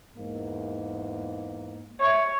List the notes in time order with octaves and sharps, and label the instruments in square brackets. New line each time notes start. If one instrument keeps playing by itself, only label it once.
[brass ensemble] E2 G#2 A#3
[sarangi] C#5 [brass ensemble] E5